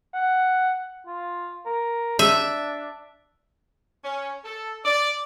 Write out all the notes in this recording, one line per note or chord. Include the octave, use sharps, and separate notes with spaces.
F#5
F4
A#4
D4 E5
C#4
A4
D5